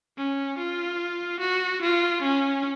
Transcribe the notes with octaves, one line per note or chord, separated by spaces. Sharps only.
C#4
F4
F#4
F4
C#4